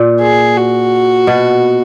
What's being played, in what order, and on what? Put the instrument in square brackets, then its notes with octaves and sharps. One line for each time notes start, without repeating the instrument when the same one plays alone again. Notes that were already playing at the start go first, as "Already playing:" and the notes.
Already playing: [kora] A#2
[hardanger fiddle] G#4
F#4
[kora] B2